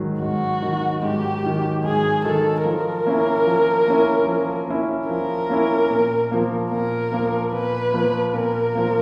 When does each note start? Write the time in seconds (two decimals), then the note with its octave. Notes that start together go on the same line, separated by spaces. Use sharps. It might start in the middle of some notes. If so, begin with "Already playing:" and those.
Already playing: G#2 D#3 F#3
0.22 G#2 F#4
0.62 D#3 F#3
1.02 G#2 G4
1.44 D#3 F#3
1.84 G#2 G#4
2.25 D#3 F#3 A4
2.65 F3 A#4
3.06 A#3 C#4 E4
3.47 F3
3.87 A#3 C#4 E4
4.27 F3
4.69 A#3 C#4 E4
5.09 F3 A#4
5.50 A#3 C#4 E4
5.90 A#2
6.31 F3 A#3
6.71 A#2 A#4
7.12 F3 A#3
7.53 A#2 B4
7.94 F3 A#3
8.34 A#2 A#4
8.75 F3 A#3